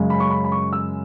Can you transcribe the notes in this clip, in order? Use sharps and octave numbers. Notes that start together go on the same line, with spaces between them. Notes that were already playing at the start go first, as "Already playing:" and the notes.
Already playing: F#2 C#3 G#3
B5
C#6
B5
B5
C#6
E6